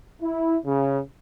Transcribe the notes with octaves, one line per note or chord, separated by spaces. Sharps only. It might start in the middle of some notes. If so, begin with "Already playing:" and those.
E4
C#3